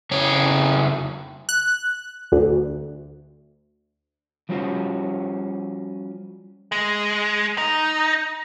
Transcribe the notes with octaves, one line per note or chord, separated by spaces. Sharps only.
F2 C#3 C#5
F#6
D2
F3 G3 C#4 F4 F#4 C5
G#3
D#4